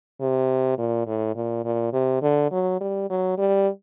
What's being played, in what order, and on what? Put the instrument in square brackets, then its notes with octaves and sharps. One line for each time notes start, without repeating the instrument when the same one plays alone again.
[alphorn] C3
A#2
A2
A#2
A#2
C3
D3
F#3
G3
F#3
G3